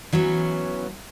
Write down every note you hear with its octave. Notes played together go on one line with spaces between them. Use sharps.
E3 F#3 B3 C#4